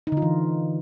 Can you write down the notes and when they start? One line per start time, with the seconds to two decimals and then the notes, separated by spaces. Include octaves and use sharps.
0.07 D#4
0.12 D3
0.17 F4
0.22 E3